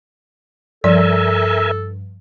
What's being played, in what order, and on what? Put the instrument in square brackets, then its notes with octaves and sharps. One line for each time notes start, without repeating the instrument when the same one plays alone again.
[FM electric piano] G2 [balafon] F3 D5 [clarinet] A4 [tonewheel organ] A#4 E5 G#5